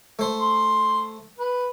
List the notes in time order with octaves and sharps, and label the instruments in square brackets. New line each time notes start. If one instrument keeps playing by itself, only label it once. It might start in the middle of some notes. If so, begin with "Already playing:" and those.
[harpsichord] A3 C5
[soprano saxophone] C6
B4